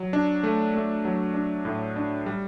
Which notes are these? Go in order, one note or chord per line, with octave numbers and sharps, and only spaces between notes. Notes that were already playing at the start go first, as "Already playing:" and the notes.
Already playing: F#3
D4
A3
A3
F#3
D4
A2
D4
G3